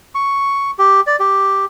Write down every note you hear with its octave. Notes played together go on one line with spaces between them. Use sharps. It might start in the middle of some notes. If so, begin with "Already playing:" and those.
C#6
G4
D5
G4